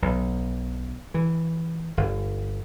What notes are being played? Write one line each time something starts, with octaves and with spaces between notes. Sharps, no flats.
B1
E3
G1